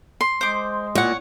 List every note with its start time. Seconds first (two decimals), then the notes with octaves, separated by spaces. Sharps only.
0.21 C6
0.41 G#3 C5 D6
0.95 A#2 C#5 F#5